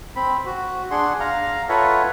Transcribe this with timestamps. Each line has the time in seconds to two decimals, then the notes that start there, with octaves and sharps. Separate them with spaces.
0.16 C4 B5
0.45 F#4
0.91 D4 G#4 F#5 C6
1.20 F5 A#5
1.69 F4 A4 B4 C#5 E5 F#5